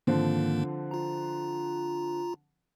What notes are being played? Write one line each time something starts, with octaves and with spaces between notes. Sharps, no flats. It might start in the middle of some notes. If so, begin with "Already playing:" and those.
G#2 D3 D#3 F3 A#3 C4
F4 A#5